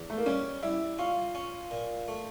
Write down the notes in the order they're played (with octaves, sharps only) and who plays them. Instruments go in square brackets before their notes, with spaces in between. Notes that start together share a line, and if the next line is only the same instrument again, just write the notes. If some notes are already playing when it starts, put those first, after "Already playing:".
Already playing: [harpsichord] E2
[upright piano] A3
A#3
[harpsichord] G3 [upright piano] C#4
[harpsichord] G3 [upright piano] E4
[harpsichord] C#4 [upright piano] F4
[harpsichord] C#4
A#2
A3